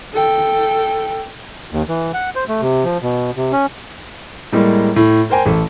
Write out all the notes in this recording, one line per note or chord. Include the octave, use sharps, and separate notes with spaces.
A4 G5
D#2
E3
F#5
C5
A3
C3
F3
B2
C3
C#4
A2 G3 G#3 A#3
A2
A#4 C5 G5 G#5 A#5
A1 A4